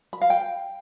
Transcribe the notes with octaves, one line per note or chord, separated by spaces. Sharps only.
B5
F5
G5